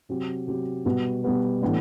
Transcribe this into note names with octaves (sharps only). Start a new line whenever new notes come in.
C3 F#3 C4 G4
C3 F#3 C4 G4
B2 G3 B3 F#4 B4
B2 G3 B3 F#4 B4
A2 E3 G3 B3 D4